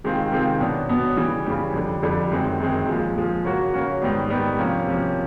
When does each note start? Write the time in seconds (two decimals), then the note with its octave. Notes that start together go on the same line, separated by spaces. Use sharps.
0.04 C3 D#3 G#3 C4 F4
0.32 C3 D#3 G#3 C4 F4
0.60 B2 F#3 B3 D4
0.89 B2 F#3 B3 D4
1.17 C#3 E3 G3
1.46 C#3 E3 G3
1.74 F2 D3 G3
2.03 F2 D3 G3
2.32 F#2 D#3 G#3 C4
2.60 F#2 D#3 G#3 C4
2.87 A#2 F3 G#3
3.16 A#2 F3 G#3
3.44 C#3 F#3 A#3 C#4 F#4
3.74 C#3 F#3 A#3 C#4 F#4
4.02 G#2 D#3 G3 B3
4.30 G#2 D#3 G3 B3
4.59 C3 F3 A#3 C#4
4.87 C3 F3 A#3 C#4